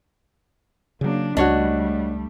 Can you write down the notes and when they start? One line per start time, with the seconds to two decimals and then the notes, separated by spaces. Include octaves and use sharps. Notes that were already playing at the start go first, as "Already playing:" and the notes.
1.01 C#3 F#3 A#3 D4
1.37 C#2 G3 A3 D4 F#4 C#5 D#5